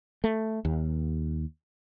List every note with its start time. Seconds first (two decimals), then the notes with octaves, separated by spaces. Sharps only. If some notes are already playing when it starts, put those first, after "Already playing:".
0.24 A3
0.65 D#2